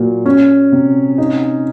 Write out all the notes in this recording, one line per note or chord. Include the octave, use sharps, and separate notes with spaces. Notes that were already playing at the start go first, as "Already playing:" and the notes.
Already playing: A#2 F#3
C#4
C3
D#4